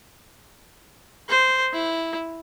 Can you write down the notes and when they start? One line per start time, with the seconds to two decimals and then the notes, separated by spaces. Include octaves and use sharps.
1.29 C5
1.73 E4